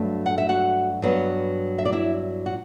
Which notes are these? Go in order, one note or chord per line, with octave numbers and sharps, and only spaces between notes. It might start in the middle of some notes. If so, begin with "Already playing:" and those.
Already playing: G2 F#3 A3
F#5
E5
F#4 F#5
G2 F#3 B3
E5
D5
E4 E5
F#4